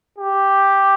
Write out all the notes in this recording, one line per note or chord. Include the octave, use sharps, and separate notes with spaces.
G4